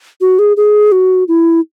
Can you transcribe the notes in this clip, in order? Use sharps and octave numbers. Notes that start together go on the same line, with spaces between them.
F#4
G#4
G#4
F#4
E4